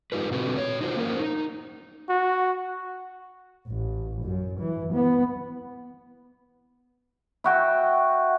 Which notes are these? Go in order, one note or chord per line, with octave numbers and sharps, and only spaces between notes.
F#2 D#4 F4 G4 B4
B2 D3 A3 C4 F#4 B4
A#2 C#5
D#4 F4 F#4 C5
A#3 C#4 F#4 A#4 C5
D#4
F#4
A1
F#2
E3
B3
E4 F#4 G5